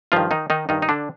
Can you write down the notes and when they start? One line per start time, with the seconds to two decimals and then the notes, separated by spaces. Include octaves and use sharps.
0.12 G2 D#3 F3 F4
0.31 D#3 D#4
0.50 D#3 D#4
0.69 G2 D#3 D#4
0.82 D#4
0.89 D3 D4